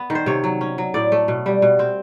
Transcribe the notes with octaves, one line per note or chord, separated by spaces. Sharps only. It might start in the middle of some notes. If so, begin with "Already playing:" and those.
Already playing: B3
D#3
C5
C3 C#5
F#3
C#4
F#3
A2 D5
A3
B2
G3
B2
C4